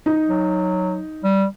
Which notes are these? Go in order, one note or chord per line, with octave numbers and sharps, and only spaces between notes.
D#4
F#3
G3